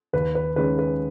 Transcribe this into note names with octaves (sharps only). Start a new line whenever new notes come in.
D#2 B4
B4
D#3 G#3 C#4 B4
B4